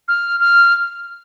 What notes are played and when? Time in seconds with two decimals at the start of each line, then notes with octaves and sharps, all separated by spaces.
0.08 F6
0.40 F6